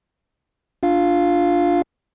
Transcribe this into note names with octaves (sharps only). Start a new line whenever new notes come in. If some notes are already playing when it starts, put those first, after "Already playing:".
D4 F4 F5